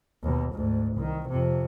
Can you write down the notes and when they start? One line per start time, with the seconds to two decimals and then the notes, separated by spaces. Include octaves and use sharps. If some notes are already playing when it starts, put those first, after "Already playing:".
0.23 D#2 B2
0.53 D2 G#2
0.96 C2 D#3
1.29 F2 C3